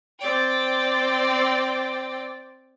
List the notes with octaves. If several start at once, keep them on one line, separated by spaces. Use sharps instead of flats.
C4 D5 G5